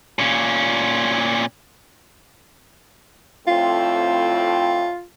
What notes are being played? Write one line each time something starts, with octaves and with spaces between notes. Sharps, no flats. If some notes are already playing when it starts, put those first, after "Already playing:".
A#2 C#4
F2 A2 C4 F4